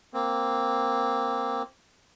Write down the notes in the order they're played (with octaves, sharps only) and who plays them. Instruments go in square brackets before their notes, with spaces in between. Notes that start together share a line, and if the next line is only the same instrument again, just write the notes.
[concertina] A#3 C4